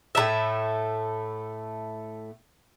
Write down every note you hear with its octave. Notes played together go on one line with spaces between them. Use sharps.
A2 F#3 A3 E5